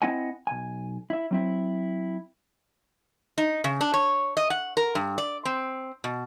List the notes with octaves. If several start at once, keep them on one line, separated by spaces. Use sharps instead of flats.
C4 E4 D#5 F#5 G#5
B1 G#5
E4 E5
F#3 C4 E4
D#4
C#3
D4
C#5
D#5
F#5
A#4
G2
D5
C4
B2